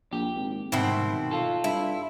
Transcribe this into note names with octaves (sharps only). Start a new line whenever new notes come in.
A#1 G4
G#1
C2 G#2 B2 D#3 C4 E4
F4 A4
G2 E4